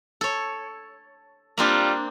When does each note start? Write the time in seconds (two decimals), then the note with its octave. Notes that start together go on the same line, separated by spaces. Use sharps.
0.21 A4 C#5
1.57 G3 A#3 C4 D4 F4